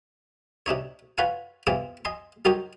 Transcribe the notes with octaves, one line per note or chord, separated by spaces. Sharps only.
C3 D4 D#4 C#5
F4 B4 C#5 F5 F#5 G#5
E2 C3 E3 C4 F4 G#5
D#5 G#5 C6
F#3 D#4 G4 A#4 C5 C#5